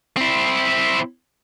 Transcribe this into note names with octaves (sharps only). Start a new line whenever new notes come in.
C4 E4